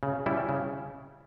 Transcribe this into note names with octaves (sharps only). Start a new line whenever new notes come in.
C#3
G3 C#4 E4
C#3